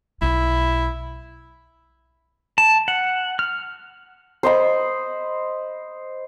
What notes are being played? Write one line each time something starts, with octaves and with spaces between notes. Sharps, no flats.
B1 E4
A5
F#5
F6
C5 D#5 B5